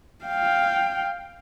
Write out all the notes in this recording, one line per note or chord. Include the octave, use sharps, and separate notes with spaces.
F5 G5